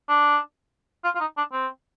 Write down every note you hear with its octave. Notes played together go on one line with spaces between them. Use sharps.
D4
F4
F4
D#4
D4
C4